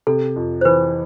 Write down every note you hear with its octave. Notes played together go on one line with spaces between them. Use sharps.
C3 A4
F2
C5
E3 B4